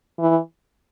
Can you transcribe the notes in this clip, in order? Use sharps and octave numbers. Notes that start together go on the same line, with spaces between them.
E3